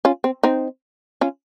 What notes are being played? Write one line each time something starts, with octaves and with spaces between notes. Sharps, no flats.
C#4 F4
C4
C4 D#4
C#4 F4